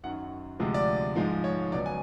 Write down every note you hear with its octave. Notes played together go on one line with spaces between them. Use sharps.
F#2 D#3 F#3 F#5
D2 C3 F3 G#3
D5
G#2 F3 G#3
C#5
C#2 B2 F#3 D5
G#5